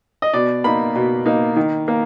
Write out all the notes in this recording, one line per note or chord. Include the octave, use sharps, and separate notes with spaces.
D#5
B2 D5
A#3 D#4 B5
B2
A#3 D#4
D#3
A#3